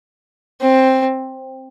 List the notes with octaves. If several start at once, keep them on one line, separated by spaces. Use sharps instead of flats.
C4